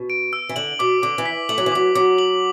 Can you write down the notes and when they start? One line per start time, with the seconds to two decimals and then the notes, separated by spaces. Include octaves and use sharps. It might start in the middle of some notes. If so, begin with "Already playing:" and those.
Already playing: B2
0.10 D7
0.33 E6
0.49 E3
0.56 D3 F#7
0.79 B2 D6
1.03 D3 D6
1.18 E3
1.26 B6
1.49 A3 F#7
1.58 F#3
1.66 E3
1.72 F#3 D6
1.95 F#3 D6
2.18 F#7